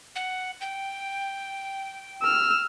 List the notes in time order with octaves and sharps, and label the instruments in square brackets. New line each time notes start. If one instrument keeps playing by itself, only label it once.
[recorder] F#5
G5
[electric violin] E6 F6